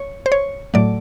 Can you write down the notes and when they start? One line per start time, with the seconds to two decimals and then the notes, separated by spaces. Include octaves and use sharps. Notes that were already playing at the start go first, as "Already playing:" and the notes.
Already playing: C#5
0.26 C5
0.32 C#5
0.74 A2 F#3 A3 D5